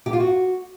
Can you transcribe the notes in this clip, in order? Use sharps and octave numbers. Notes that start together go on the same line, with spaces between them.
G4
F4
F#4